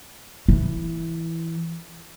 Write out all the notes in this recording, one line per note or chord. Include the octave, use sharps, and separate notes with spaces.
E3